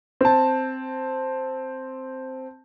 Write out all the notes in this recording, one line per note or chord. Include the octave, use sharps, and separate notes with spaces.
C4 A5